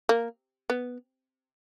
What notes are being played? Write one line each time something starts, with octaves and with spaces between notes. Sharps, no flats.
A#3
B3